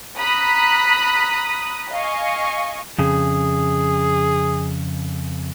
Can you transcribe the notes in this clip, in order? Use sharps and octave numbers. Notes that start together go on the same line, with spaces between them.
A#5 B5 D#6 F#6 B6
D#5 F5 G#5 C#6
F2 C#3 G#4